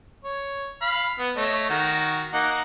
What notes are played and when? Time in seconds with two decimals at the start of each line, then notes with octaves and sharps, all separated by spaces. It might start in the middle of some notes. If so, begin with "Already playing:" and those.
0.24 C#5
0.82 F5 B5
1.19 B3
1.36 A3 C#5 D#5
1.70 D#3 F#4
2.33 A#3 D#4 F#5